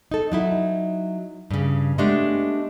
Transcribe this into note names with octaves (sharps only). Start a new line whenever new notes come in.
D#4 A4
F#3 D#4 E4
G2 C#3
G#3 A3 B3 D4 G4